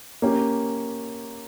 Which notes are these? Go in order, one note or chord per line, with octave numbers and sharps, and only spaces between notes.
A#3 C#4 G4